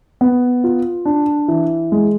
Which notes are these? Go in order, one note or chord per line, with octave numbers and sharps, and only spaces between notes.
B3
F4
D4
E3
G#3